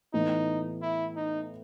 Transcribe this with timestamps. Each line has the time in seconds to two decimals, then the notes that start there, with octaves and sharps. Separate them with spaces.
0.14 A2 E3 B3 D#4
0.82 E4
1.16 D#4